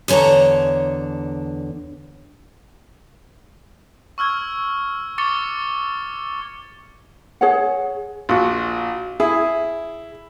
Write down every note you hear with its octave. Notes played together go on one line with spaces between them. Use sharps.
E2 D3 C#5 A5 A#5
C#6 E6 F6 G#6
C#6 D6 A6 C#7 G7
G#4 C#5 F#5
A#1 F4 F#4
E4 G#4